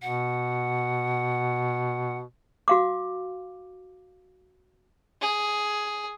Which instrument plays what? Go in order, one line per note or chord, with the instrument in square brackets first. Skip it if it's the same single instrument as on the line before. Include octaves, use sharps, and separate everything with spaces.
[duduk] B2 [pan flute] F#5
[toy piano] F#4 F5 D6
[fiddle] G#4